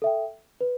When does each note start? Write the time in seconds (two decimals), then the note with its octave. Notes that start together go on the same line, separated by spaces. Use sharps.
0.02 A4 E5 G5
0.61 B4